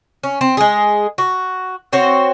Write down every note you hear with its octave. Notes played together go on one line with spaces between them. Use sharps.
C#4
C4
G#3 G#4
F#4
C4 F#4 C5 C#5